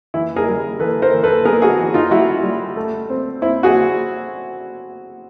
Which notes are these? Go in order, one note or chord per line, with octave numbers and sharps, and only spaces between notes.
E3 E4
G#4 A#4
G3
E3 A4 B4
A#4 C5
E3
A4 B4
B3 G#4 A#4
F#4 G#4
E3
D#4 F4
G3 E4 F#4
G3
A3
C4
C4 E4
F#4 G#4